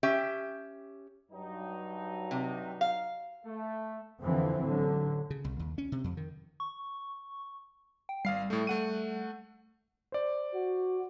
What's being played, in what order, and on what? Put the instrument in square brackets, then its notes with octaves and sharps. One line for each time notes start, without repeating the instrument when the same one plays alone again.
[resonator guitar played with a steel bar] C#4 G4 E5 G5
[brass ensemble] G2 F#3 D#4
[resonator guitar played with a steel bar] C3
F5
[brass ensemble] A3
[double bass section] F2 D3 E3 F3 C4
A1 D3 F#3
[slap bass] C#3
C2
D#2
C#4
C3
F2
D#3
[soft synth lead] C#6
G5
[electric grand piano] G#1 F5 C7 [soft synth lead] G3
[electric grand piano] A2 A3
A3 F#5 D#7
C5 D5
[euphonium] F#4